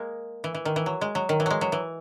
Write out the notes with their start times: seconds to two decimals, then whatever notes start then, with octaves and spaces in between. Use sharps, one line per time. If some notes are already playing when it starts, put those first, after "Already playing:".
Already playing: G#3 A#3
0.44 E3
0.55 E3
0.65 D#3
0.76 E3
0.86 F#3
1.01 G#3
1.15 F#3
1.29 D#3
1.40 E3
1.46 F#3 G#3
1.61 F#3
1.72 E3